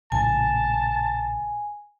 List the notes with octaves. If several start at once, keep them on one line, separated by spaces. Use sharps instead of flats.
A#1 A2 C#3 G#5 A5